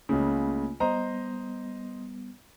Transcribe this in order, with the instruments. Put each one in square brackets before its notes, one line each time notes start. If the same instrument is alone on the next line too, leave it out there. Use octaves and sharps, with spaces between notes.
[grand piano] C#2 C#3 [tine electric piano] A3 A#3 C#4
[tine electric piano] G3 B3 [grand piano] C5 D#5 A#5